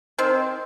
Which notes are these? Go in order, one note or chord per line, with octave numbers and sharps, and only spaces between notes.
D#3 C4